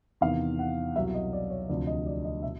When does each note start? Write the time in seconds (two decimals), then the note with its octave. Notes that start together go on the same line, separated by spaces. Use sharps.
0.21 E2 C3 D#3 F5
0.59 F#5
0.95 C2 B2 F#3 E5
1.14 D#5
1.33 D5
1.50 C#5
1.69 D2 C3 F3 D5
1.87 D#5
2.07 D5
2.25 D#5
2.43 B2 F#3 E5